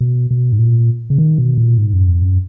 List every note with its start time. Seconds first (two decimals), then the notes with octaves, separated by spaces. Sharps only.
0.01 B2
0.31 B2
0.52 G#2
0.59 A#2
1.10 C#3
1.18 D#3
1.38 B2
1.58 A#2
1.78 G#2
1.93 F#2
2.08 F2
2.22 F#2